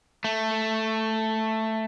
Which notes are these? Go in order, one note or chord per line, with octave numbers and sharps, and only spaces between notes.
A3